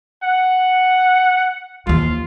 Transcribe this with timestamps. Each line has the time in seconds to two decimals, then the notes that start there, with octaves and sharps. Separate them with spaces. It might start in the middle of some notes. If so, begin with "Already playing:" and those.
0.24 F#5
1.87 D#2 F3 F4